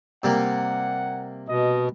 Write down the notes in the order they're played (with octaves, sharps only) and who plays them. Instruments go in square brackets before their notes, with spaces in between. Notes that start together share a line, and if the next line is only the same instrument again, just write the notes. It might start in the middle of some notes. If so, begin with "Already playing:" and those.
[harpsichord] C3 G3 A#3 [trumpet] F#5
[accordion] B2 [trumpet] D#5